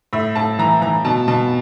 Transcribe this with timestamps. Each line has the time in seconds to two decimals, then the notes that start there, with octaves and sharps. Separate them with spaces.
0.13 A2 E5
0.35 A2 A5
0.59 E3 A#5
0.82 E3 A#5
1.05 B2 A5
1.28 B2 A5